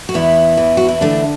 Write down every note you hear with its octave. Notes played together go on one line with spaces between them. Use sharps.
F#4
E2 B3 E4
E3
F#4
E4
D3 A3 D4